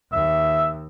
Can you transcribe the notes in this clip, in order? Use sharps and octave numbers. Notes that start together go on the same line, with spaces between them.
D#2 E5